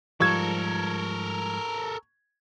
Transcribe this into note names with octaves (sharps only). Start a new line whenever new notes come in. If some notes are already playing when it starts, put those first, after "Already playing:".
G#2 F3 G3 A4 A#4 C#6 G#6